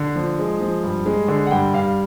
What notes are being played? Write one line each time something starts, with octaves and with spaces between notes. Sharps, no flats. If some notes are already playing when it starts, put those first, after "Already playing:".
Already playing: D3
F3
G#3
F3
G2
G#3
D3
F#5
G2 G5
G2 F5